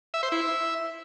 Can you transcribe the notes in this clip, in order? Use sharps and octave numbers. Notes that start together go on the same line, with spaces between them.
E5
C5
E4
E5